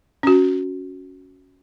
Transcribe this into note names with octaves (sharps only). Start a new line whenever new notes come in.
C#4 F#4